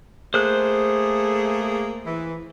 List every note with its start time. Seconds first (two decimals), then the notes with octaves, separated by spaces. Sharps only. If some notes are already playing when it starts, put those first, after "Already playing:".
0.34 A3 A#3 G#4 C5 F#6
2.07 E3